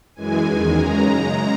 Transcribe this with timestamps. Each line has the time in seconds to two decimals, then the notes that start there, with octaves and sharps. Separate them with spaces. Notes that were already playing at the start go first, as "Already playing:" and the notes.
0.15 F#2 E3 G#3 G#5
0.46 E2 D#3 G#3
0.77 F#2 C#3 G#3 A#5